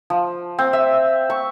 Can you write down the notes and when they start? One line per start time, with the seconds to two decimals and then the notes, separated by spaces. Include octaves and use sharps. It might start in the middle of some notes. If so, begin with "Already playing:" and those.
0.10 F3
0.59 C4
0.73 E5
1.30 C#6